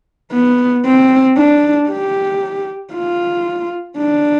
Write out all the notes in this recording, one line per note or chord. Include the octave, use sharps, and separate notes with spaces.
B3
C4
D4
G4
F4
D4